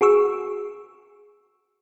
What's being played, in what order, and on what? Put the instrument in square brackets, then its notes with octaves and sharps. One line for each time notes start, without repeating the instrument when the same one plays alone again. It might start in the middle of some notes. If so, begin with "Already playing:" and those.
[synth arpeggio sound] F#4 G#4 C#6 E6